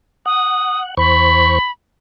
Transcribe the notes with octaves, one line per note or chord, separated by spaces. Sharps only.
F#5 D#6
E2 C5 B5 C#6